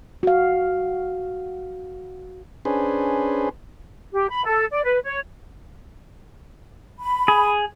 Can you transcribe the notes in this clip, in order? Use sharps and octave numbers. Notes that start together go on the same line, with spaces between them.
F#4 F5
C#4 D4 G#4 B4 C5
G4
B5
A4
D5
B4
C#5
B5
G#4